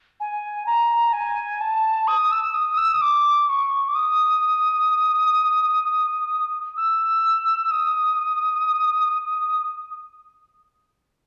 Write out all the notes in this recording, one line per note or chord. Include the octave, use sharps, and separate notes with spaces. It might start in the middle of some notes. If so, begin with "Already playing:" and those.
G#5
A#5
G#5
A5
D#6
E6
D#6
E6
D#6
D6
C#6
D6
D#6
E6
D#6